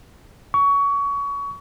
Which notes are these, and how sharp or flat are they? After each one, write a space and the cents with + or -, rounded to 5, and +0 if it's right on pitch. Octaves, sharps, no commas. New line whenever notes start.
C#6 +25